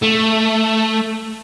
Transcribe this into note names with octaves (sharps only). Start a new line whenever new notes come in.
A3